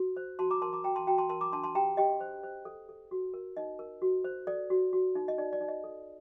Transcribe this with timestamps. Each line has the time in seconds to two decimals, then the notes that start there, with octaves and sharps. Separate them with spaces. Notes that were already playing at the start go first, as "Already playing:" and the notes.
Already playing: F#4
0.17 C5
0.39 F#4 A5 C6
0.51 A#5 D6
0.62 A#4 A5 C6
0.73 A#5 D6
0.84 F#4 G5 A#5
0.96 A5 C6
1.07 F#4 G5 A#5
1.18 A5 C6
1.29 A#4 A5 C6
1.41 A#5 D6
1.52 D4 A5 C6
1.64 A5 C6
1.75 G4 G5 A#5
1.97 G4 D#5 G5
2.20 C5
2.43 C5
2.65 A4
2.89 A4
3.11 F#4
3.34 A#4
3.57 D#4 D#5
3.79 A#4
4.02 F#4
4.24 C5
4.47 A4 D5
4.70 F#4
4.93 F#4
5.15 D#4
5.28 D#5
5.38 D#4 D5
5.53 D5
5.61 D#4
5.68 D#5
5.84 A4